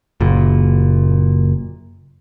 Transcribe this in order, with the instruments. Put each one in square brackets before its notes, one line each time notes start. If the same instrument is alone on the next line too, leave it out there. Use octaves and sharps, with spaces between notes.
[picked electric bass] F#1 A#2